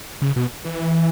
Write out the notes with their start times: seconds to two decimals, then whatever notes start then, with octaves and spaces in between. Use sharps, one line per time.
0.22 C#3
0.36 B2
0.65 E3